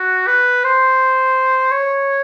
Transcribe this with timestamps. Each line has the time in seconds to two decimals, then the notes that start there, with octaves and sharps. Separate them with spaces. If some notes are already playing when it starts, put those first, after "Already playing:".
Already playing: F#4
0.27 B4
0.64 C5
1.71 C#5